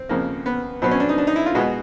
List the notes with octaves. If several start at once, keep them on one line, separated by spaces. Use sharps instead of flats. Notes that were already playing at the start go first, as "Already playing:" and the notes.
Already playing: C4
F2 C#3 F3 A#3
B3
B2 F#3 B3 C4
C#4
D4
D#4
D4
D#4
E4
F4
B2 G#3 B3 F#4